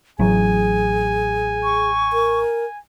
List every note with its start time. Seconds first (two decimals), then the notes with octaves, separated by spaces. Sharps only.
0.19 A1 A2 F#3 G#4 G#5
1.63 C#6
2.13 A#4